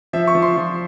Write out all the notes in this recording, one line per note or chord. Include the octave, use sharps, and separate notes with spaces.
F3 E5
C#6
F3
C6
F3